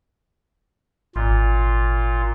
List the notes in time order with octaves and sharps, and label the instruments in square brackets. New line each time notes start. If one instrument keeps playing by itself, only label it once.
[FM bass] G#1 [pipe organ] A#2 F4